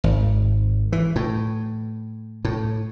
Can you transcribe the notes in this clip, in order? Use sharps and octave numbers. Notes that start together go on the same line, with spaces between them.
G#1
E3
A2
A2